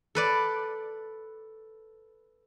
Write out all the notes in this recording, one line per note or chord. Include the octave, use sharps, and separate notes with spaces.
A4 B4 D5